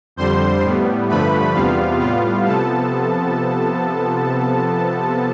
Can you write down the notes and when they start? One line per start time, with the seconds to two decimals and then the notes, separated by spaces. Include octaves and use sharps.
0.16 F2 D3 G3 C5 C6
0.63 A2 G3 B3
1.09 G2 D3 F3 A3 B4 B5
1.54 E2 C3 G3 B3 F4 F5
2.00 A2 G3 B3 F4 F5
2.46 C3 F3 B3 A4 A5